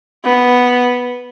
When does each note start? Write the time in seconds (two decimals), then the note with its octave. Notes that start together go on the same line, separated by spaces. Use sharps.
0.24 B3